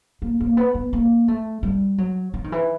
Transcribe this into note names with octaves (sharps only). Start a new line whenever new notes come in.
A#3
A#3
B3
B3
A#3
A3
G3
F#3
F3
D#3
E3